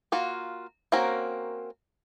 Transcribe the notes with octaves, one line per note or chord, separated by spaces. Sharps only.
A#3 F4 F#4
A#3 C4 C#4 F#4 A#4